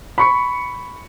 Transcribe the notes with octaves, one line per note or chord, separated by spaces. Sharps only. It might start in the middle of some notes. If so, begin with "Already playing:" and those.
B5 C#6 C#7